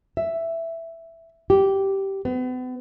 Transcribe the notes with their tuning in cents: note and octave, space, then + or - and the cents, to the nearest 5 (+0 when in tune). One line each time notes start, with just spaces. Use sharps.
E5 +5
G4 -10
B3 +40